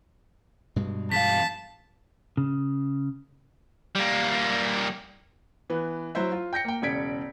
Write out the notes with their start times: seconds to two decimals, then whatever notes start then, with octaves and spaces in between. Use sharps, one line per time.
0.76 G2 B2 G#3
1.12 E2 F5 A5 B6
2.37 C#3
3.95 G3 A#3
5.70 E3 B3
6.15 F#3 E4 C5 E5
6.32 F4
6.53 G5 G6 A#6 C#7
6.65 A#3 G5
6.82 E1 C#3 D5 G#6 B6 D7